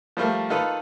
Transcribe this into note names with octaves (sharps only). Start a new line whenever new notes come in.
F3 G3 A3 A#3
D#3 F4 A4 B4